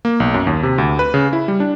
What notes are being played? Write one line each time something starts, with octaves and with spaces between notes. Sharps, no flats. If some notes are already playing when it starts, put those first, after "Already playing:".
A#3
B1
F#2
D#2
C3
D2
B4
C#3
E4
G3
D4